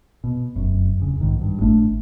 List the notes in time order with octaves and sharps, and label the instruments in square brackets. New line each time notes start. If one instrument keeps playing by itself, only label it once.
[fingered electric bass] B2
F1 F#2
D1 F2 C#3
B1 G#2 D#3
G2
G#1 A2 A3 D4